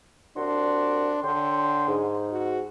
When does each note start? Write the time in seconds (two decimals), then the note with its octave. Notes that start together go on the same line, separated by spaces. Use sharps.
0.37 C2 D4 F#4 C6
1.23 D3 C#5 G5 C6
1.88 G#2
2.32 F#4